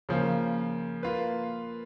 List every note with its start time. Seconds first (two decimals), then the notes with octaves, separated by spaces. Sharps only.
0.09 C#3 F3 A#3
1.03 A#3 F4 B4